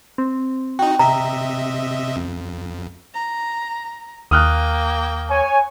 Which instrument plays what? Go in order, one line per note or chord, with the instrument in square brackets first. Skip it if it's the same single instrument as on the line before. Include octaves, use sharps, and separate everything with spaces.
[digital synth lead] C4
[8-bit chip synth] D#4 F#4 [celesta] G5
[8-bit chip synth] C3 D#5 E5 [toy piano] A#5
[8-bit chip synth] F2
[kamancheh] A#5
[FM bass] D#2 [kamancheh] A#3 G5 [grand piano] D#6 F6 F#6
[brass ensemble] C#5 G#5